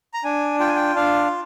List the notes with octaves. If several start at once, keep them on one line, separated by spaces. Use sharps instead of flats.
A#5
D4 G#5
F4 G5
G#5
G5
D4 F5